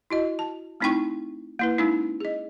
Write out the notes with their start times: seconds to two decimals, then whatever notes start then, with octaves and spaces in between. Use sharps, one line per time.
0.10 E4 F#4 D#5
0.39 A5
0.80 A3 C4 D#4 E4 G5 C#6
1.59 A#3 E4 B4
1.78 G#3 C#4 D#4 E4
2.20 G#4 D#5